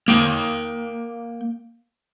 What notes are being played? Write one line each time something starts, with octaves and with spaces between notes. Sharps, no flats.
A#3 G5